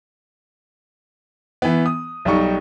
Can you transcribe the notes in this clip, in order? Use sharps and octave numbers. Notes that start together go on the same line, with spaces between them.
E3 B3
D#6
B1 G3 D#4 C#6